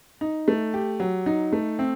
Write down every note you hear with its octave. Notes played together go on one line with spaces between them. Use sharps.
D#4
A3
G4
F#3
D#4
A3
C4